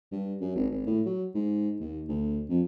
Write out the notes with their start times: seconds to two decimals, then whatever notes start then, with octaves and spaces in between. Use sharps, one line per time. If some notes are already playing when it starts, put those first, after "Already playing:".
0.11 G2
0.41 F#2
0.56 G#1
0.70 G#1
0.86 A2
1.05 F#3
1.35 G#2
1.80 D#2
2.09 D2
2.49 F2